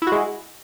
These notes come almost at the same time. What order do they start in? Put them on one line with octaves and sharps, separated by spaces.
E4 F#4 G#3